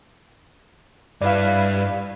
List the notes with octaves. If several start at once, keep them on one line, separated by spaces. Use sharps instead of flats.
G2 E4 B4 D5 F5